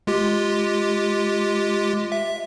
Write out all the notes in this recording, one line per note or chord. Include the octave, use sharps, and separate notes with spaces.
G#3 F4 G4
E5